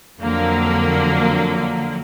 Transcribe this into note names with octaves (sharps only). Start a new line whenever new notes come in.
F2 D3 F#3 A#3